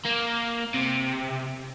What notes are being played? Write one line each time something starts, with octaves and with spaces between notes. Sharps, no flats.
A#3
C3